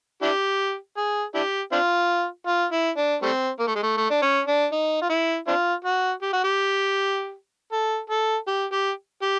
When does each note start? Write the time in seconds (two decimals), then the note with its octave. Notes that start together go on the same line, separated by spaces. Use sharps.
0.22 D4 E4 G4
0.97 G#4
1.35 D4 E4 G4
1.72 C4 D4 F4
2.47 F4
2.72 E4
2.97 D4
3.22 G3 A3 C4
3.59 A#3
3.67 A3
3.75 G#3
3.83 A3
3.97 A3
4.10 D4
4.22 C#4
4.47 D4
4.72 D#4
5.02 F4
5.09 E4
5.47 C4 D4 F4
5.85 F#4
6.22 G4
6.33 F#4
6.44 G4
7.72 A4
8.10 A4
8.47 G4
8.72 G4
9.22 G4